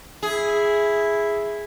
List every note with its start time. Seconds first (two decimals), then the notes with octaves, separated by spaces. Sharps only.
0.23 E4 G#4